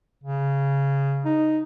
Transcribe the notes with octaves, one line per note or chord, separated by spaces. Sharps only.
C#3
D#4